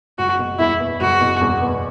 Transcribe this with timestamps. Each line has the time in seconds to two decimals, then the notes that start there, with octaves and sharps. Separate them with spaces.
0.18 F#1 F#4
0.39 B2
0.59 E2 E4
0.80 B3
1.00 F#1 F#4
1.21 B2
1.41 E2
1.62 B3